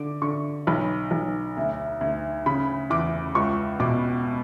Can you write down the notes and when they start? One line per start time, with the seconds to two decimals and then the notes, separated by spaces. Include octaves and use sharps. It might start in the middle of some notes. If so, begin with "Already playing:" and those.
Already playing: D3 D6
0.22 D3 C#6
0.67 B1 B5
1.11 B1
1.57 D2
2.01 D2
2.46 C#3 B5
2.90 E2 D6
3.35 C#2 C#6
3.80 B2 D6